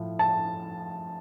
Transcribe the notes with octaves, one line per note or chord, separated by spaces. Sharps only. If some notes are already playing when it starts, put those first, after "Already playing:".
Already playing: A2 F3
A5